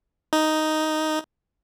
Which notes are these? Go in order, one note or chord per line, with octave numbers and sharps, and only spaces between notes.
D#4